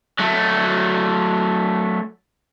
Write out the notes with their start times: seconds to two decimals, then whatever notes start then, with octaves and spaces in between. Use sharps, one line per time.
0.19 F#3 A3